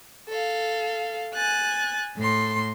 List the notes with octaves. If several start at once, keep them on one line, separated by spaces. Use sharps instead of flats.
A4 F5
G#5 F#6 A6
A2 A4 C6